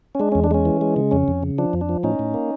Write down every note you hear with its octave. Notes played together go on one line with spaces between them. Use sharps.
C#4
G#3 D4
C#4
E2
D4
G#3 C#4
E3
G#3
C#3
F2 C#4
F2
C#3
F3 D4
F2
D4
F3
A2 C#4 D#4
A2
A#3